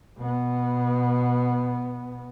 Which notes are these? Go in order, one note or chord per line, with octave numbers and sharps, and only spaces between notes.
B2 B3